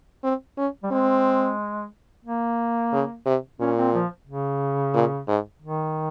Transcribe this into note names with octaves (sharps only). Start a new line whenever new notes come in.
C4
C#4
G3
G#3 C4
A#3
C#3
C3
A#2 C#4
C4
F3
C#3
A#2
G#2
D#3